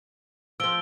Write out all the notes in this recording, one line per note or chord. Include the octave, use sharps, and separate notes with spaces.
F3 C4 E6 D7 G7